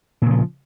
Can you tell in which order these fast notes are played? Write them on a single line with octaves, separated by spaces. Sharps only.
A#2 C#3 F3